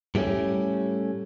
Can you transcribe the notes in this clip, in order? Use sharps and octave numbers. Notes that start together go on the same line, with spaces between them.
A2 G3 A3 C#4